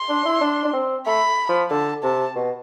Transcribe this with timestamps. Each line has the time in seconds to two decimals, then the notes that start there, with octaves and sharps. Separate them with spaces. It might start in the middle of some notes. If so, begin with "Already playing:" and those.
Already playing: C6
0.09 D4
0.25 E4
0.41 D4
0.65 D4
0.73 C4
1.06 A3 B5
1.49 F3
1.70 D3 A5
2.03 C3 A5
2.36 B2